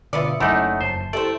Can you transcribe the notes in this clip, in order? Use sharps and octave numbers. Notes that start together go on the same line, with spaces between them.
B2 D3 F4 B4 D5 E5 D#6 C#7
F#1 F#2 A3 D#4 E4 D5
F2 C5 A5
A3 E4 G4 A4 C5 D5